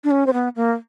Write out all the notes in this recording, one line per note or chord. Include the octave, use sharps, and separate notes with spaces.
D4
C#4
C4
B3
A#3